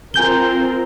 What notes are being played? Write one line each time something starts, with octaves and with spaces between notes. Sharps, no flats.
C4 F4 A#4 G#5 G6 G7